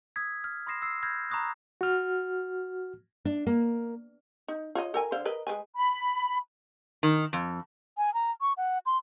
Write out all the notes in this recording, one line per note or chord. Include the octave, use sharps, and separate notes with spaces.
D#6 E6 G#6 B6
F6
B5 C6 D#6 A#6 C7 E7
E6 C7
B5 E6 F6 G6 G#6 A#6
A#5 B5 C#6 D#6 F#6 A#6
F#4 F6
D4
A#3
D#4
F4 C#5 D#5
A4 A#4 G#5
D3 C5 F5
A#4 B4 D#5
G#3 B4 G#5
B5
D#3
F2
G#5
A#5
C#6
F#5
C6